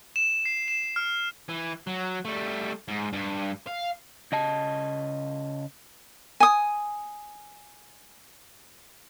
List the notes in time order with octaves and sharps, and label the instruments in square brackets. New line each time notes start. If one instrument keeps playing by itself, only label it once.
[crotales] E7
C7
E7
F6
[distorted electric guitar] E3
F#3
G3 A3
G#2
G2
F5
[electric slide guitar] C#3 D#5 A5
[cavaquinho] G#5 D#6